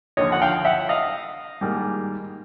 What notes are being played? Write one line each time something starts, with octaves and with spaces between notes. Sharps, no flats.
D#2 D3 F3 C#5 D#5
F#5
F5 G5
E5 F#5
D#5 F5
G#2 D#3 G3 A#3